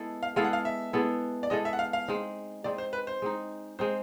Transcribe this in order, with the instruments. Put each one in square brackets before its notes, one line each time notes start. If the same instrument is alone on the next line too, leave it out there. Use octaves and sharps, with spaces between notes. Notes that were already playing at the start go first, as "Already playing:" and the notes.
Already playing: [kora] G#3 B3 E4 A4
[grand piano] F5
[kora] G#3 B3 E4 A4 [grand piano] F5
[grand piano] F#5
F5
E5
[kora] G#3 B3 E4 A4
[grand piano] D5
[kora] G#3 B3 E4 A4 [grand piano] D#5
[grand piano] E5
F#5
F5
F5
[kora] G#3 C4 D#4
[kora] G#3 C4 D#4 [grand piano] D5
[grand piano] C5
B4
C5
[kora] G#3 C4 D#4
[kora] G#3 C4 D#4 [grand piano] C5